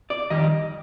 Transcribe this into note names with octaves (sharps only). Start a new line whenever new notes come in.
D5
F2 D#3 G3 D#5